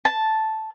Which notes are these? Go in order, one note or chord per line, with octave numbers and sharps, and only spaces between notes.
A5